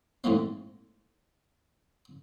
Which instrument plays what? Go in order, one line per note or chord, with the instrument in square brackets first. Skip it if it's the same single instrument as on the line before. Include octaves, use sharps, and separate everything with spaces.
[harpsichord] G#2 E3 A3 A#3 C4